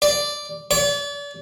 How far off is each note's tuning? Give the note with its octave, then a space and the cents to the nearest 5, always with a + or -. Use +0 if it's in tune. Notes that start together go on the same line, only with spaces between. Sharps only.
D5 +0
D5 -40